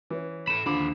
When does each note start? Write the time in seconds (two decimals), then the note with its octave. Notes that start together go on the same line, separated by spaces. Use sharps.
0.10 E3 C#4
0.47 A4 B5 E7
0.66 D#2 D3 F3 B5 D6